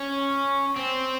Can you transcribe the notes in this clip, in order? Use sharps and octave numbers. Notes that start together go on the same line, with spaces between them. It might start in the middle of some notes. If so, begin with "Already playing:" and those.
Already playing: C#4
C4